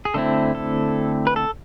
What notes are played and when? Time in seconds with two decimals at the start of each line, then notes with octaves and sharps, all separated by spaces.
0.05 G#4
0.14 D3 A3 C4 E4 A4
0.55 A4
1.27 B4
1.36 A4